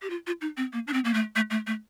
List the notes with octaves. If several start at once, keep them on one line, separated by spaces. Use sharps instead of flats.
G4
F4
F4
D#4
C4
A#3
D4
C4
A#3
A3
A3
A3
A3